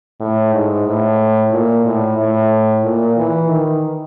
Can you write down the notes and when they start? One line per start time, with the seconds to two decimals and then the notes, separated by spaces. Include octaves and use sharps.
0.20 A2
0.53 G#2
0.85 A2
1.52 A#2
1.85 A2
2.18 A2
2.83 A#2
3.17 E3
3.50 D#3